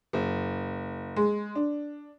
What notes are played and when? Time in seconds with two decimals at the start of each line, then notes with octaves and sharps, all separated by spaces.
0.13 F#1
1.16 G#3
1.55 D4